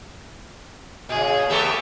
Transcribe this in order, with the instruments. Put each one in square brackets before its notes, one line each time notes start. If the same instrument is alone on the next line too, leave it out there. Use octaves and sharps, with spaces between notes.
[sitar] A#2 C#3 [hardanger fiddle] G#4
[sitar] A3 B3 G4 [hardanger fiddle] E5 C#6